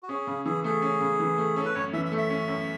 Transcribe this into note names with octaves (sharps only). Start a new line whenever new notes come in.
F#4
C#4 G#4
C#3
E3 G#4
A3 G#4
C#4
C#3
E3
A3
C#4 A4
B4
F#2 C#5
E3 E5
E5
A3
E5
C#4
F#2